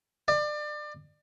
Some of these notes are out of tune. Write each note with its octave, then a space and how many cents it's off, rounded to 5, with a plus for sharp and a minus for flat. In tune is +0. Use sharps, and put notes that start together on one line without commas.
D5 +30